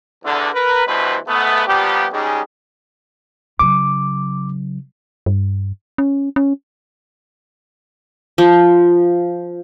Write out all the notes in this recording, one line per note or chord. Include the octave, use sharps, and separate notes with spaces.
E2 D3
A#4 B4
D2 G2 B2 E3 B4 C5
G#2 A3 B3
A#2 F3 G3 B3 G4
G3 G#3 C#4 D#4 G4 G#4
C#3 F#3 D6
G2
C#4
C#4
F3